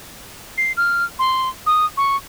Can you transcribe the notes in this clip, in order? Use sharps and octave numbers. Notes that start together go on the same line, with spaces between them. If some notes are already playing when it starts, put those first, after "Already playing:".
C7
F6
C6
D#6
C#6